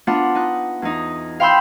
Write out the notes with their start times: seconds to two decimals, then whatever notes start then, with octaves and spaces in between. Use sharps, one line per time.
0.07 B3 D4 F4 F#5
0.35 D#4 F#6
0.82 E2 D#4
1.40 F5 G5 B5 C6 E6 G6